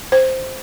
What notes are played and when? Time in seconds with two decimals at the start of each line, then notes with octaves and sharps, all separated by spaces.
0.12 C5